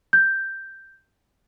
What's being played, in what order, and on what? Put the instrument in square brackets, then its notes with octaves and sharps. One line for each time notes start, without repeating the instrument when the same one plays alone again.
[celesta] G6